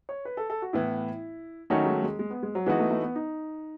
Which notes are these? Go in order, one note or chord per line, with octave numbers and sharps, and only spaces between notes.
C#5
B4
A4
A4
F#4
A2 E3 B3 E4
D#3 F#3 A3 C#4 D#4 F#4
G#3
G#3
G#3
B3
G#3
F#3
E3 G#3 B3 D#4 F#4
A3
A3
B3
D#4